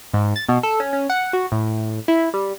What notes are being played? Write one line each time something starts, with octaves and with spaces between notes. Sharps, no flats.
G#2
A6
B2
A4
C#4
C#4
F#5
F#4
A2
E4
G3